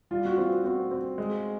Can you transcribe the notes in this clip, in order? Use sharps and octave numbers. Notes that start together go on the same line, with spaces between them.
G3 F4
F#4
C4 F4
C4 F#4
C4
G#3